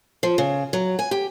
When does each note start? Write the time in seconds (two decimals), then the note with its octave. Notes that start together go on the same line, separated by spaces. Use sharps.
0.23 F3
0.38 C#3
0.73 F#3
0.99 G#5
1.11 G4